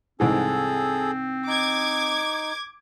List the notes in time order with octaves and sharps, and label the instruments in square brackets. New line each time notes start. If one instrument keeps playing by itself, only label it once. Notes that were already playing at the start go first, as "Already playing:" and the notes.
[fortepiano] C2 G#2 E3 [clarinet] C4 [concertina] G#4 A4
[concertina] D#4 [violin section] D6 G#6